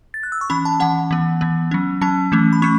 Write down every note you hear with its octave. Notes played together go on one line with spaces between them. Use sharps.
A6
F#6
E6
C#6
E3 C#4 B5
A5
E3 C#4 F#5
E3 B3
E3 B3
F#3 C#4
F#3 C#4 A5
E3 A3 C#4
B5
A3 C#4 C#6